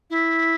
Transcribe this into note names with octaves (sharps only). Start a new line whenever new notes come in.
E4